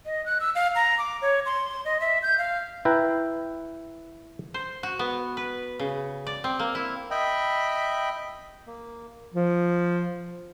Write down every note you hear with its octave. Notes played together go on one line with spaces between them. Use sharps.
D#5
F#6
E6
F5
A#5
D6
C#5
C6
D#5
E5
G6
F5
E4 B4 G5 A#5
C5
F#4
B3
B4
C#3
D5
C4
A#3
E4
D#5 E5 G5 B5
A#3
F3